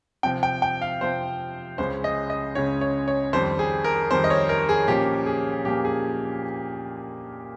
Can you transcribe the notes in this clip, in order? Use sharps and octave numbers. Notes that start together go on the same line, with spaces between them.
C3 F3 C4 G5
G5
G5
F5
C3 F3 C4 C5
C#2 C#3 G#3 C#4 C5
D#5
D#5
C#2 C#3 G#3 C#4 C#5
C#5
C#5
F2 D#3 G3 C5
G#4
A#4
F2 D#3 G3 C5
D#5
C#5
A#4
G#4
A#2 F3 A#3 C#4 G4
G#4
A#2 F3 A#3 C#4 G4
G#4